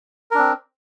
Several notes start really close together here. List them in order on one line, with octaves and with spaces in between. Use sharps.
A#4 D4 C4